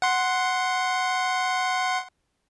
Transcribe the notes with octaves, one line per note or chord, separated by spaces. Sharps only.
F#5 C6